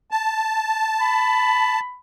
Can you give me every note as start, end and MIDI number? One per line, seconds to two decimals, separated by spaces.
0.11 1.80 81
1.01 1.98 83